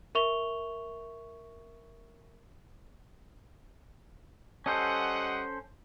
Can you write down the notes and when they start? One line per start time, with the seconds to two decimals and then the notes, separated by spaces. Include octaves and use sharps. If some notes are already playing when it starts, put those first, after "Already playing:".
0.15 A#4 E5 C#6 F7 G7
4.66 G3 C#4 A4 C5 D#5 F#5